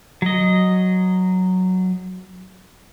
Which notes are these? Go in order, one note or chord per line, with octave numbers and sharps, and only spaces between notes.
F#3 D#5